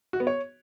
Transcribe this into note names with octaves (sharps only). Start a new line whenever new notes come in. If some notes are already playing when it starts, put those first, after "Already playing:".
F#4
B3
C#5